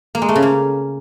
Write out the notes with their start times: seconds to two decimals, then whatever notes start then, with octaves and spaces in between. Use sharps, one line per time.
0.15 A#3
0.22 G#3
0.29 A3
0.35 C#3
0.42 A#3